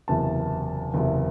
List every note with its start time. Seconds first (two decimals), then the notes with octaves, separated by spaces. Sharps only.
0.08 F#1 E2 C3 A5
0.94 F#1 E2 C3